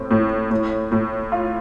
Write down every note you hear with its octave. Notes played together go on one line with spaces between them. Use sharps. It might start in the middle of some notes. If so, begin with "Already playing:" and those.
Already playing: A2 C4
A2
A2
A2
F4